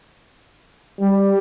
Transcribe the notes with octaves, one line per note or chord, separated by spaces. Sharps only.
G3